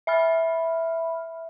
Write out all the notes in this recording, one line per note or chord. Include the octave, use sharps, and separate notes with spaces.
E5 B5 F6